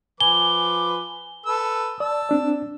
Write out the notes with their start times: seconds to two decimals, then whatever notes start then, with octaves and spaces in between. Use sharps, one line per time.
0.20 F3 B4 G#5 D6 G7
1.46 A4 B4 E6
2.00 D5 A5 E6
2.29 C4 D4 D5